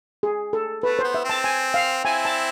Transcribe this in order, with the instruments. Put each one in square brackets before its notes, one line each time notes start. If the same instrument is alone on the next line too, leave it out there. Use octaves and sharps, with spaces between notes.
[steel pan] G#4
A4
[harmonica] A3 [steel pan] B4
[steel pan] C5
[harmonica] B3
[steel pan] E5
[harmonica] C4 [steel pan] A5
[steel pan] G#5
F5
[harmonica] C4 E4 [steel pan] G#5
[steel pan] A5